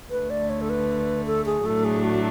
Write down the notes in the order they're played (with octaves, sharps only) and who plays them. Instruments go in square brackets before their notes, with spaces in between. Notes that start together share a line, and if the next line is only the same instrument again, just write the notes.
[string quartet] D2 D3 A3 [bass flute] B4
[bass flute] D5
C#5
A4
B4
A4
G#4
[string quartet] A2 F#3 A3 D4 [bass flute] A4
[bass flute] G#4
F#4